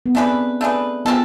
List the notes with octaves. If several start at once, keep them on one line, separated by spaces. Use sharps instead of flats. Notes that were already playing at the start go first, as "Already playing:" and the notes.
B3
A3 C4 D4 G#4 B4
A3 D4 G#4 B4
G#3 B3 C4 F4 A4